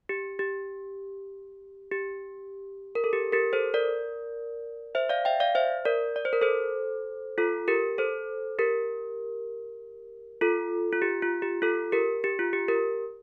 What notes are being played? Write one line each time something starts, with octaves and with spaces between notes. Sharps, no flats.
G4
G4
G4
A#4
A4
G4
G4 A#4
A4 C5
A#4 D5
C5 E5
D5 F5
E5 G5
D5 F5
C5 E5
A#4 D5
D5
C5
A#4
A4 C5
F4 A4
G4 A#4
A4 C5
G4 A#4
F4 A4
F4
G4
F4
G4
F4 A4
G4 A#4
G4
F4
G4
G4 A#4